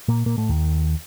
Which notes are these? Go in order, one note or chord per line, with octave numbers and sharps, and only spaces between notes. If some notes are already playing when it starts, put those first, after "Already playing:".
A#2 A#3
A#2 A#3
A2 A3
D#2 D#3